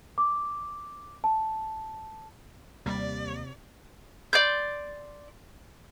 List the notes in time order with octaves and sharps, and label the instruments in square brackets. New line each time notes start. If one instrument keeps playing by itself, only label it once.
[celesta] D6
A5
[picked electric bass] D#2 A#3 [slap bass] C3 [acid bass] G3 [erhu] D5
[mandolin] D5 C6 G6